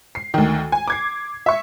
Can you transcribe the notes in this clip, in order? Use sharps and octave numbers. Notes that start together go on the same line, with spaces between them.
C7
D2 D#3
G#5
D6 G#6 C7
E5 C#6